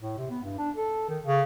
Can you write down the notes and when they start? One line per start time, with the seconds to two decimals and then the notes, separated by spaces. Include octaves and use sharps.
0.02 A2
0.18 C3
0.30 B3
0.43 G2
0.58 D4
0.76 A4
1.09 D#3
1.24 C#3